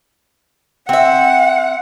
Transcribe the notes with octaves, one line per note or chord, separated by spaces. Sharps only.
C4 E5 F#5